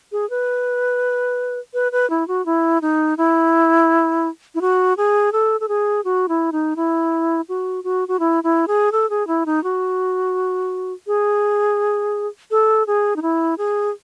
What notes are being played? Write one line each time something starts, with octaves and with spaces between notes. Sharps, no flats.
G#4
B4
B4
B4
E4
F#4
E4
D#4
E4
E4
F#4
G#4
A4
A4
G#4
F#4
E4
D#4
E4
F#4
F#4
F#4
E4
E4
G#4
A4
G#4
E4
D#4
F#4
G#4
A4
G#4
D#4
E4
G#4